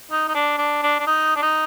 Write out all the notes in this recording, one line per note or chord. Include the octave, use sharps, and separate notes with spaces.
D#4
D#4
D4
D4
D4
D4
D#4
D4
D#4